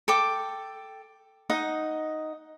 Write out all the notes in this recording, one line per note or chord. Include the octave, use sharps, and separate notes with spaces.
A4 G5 D6
D#4 D#5 F#5